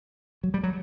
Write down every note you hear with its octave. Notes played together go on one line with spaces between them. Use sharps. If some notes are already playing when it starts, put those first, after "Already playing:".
F#3
G3
F#3